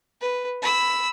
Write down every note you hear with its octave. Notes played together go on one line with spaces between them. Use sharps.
B4
B5 E6